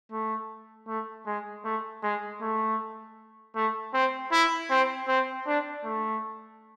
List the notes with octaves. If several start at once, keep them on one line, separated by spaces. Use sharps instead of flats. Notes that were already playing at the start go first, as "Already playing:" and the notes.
A3
A3
G#3
A3
G#3
A3
A3
C4
E4
C4
C4
D4
A3